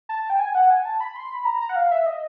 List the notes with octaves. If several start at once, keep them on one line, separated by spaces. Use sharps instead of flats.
A5
G5
G#5
F#5
G#5
A5
B5
C6
B5
A#5
A#5
F#5
F5
E5
D#5